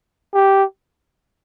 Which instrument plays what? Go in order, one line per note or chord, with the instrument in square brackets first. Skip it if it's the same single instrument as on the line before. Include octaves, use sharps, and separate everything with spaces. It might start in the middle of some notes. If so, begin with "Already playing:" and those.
[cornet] G4